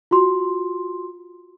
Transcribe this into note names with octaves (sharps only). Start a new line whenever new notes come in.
F4 F#4 C6